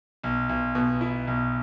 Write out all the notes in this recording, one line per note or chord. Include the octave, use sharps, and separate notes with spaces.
B1
B1
B2
E4
B1